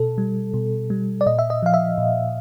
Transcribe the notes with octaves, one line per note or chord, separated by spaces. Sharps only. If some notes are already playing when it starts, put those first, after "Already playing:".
Already playing: B2 A4
G3
B2
G3
D5
A#2 D#5
E5
D#5
F3 F5
E5
A#2